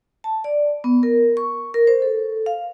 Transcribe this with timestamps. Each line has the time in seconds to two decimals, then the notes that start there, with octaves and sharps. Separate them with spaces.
0.24 A5
0.44 D5
0.84 B3
1.03 A#4
1.37 C#6
1.74 A#4
1.87 C5
2.02 A4
2.46 F5